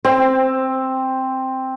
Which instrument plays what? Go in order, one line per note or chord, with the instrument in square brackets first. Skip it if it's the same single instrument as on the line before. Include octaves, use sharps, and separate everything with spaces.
[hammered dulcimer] C4 [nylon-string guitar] C5